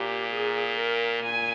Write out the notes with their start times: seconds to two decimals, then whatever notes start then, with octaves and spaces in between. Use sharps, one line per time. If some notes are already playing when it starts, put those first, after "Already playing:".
Already playing: A#2 G4
0.33 G#4
0.78 A#4
1.23 A#2 G#5